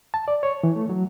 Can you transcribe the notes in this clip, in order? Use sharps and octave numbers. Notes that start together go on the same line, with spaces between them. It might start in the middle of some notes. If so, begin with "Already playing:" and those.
A5
D5
C#5
E3
A3
F#3